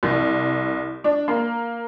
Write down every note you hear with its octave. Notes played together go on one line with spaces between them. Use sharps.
C2
D4
A#3